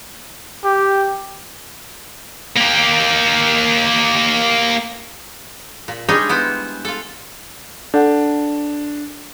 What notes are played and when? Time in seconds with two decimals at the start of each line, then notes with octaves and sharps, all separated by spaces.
0.64 G4
2.56 A#3 G4
5.88 A#2
6.09 G3 G#3 D4 D#4 C#5 D#5
6.29 B3 E4 C5
6.85 F4 A4
7.94 D4 A4 F#5